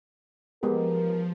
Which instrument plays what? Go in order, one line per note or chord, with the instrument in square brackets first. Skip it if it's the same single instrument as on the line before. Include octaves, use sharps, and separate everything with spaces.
[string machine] F3 [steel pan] G#3 B3 G4 [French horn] A#4